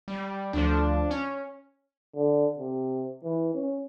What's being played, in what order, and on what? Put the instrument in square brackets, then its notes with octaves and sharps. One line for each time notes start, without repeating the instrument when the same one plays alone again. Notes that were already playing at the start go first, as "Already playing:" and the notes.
[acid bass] G3
[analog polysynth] D2 F3 [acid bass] D4
[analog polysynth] C#4
[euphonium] D3
C3
E3
C#4